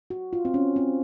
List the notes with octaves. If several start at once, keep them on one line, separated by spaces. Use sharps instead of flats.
F#4
F4
C4
C#4
C4